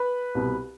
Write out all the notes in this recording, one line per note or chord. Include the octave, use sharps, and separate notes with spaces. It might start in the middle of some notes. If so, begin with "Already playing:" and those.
Already playing: B4 B5
C2 B2